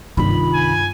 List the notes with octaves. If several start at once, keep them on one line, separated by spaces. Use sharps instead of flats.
C2 G2 C3 D#3 F4 B5
G#5